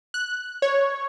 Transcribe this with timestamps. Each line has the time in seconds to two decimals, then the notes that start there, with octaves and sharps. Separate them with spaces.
0.14 F#6
0.62 C#5